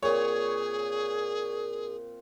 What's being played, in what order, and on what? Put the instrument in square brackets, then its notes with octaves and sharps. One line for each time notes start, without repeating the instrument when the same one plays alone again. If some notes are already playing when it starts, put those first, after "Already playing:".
[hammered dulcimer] A#2 C4 [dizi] G#4 [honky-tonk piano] C#5